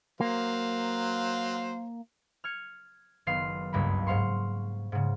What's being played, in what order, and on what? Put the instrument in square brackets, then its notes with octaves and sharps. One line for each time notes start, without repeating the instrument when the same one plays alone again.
[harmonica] F#3 C5 F5 [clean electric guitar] A#3
[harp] F6 G#6 C#7
F#1 D#3 B3 F5 C6 C7
F#1 C#2 G2 A#3 B5
G#2 C5 F5 C6 C#6
G#2 C#3